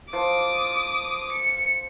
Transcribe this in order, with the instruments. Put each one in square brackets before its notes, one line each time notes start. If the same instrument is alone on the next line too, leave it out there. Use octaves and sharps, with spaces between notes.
[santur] F3 [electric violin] D6 D#6
[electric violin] C#7